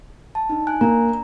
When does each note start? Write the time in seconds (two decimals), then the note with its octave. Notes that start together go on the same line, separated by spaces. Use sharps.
0.35 A5
0.50 D4 D#4
0.67 G#5 F#6
0.81 A#3 D4 A#5